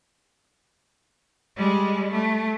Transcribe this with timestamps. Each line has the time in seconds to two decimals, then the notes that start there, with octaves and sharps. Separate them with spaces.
1.57 G3 G#3
2.12 A3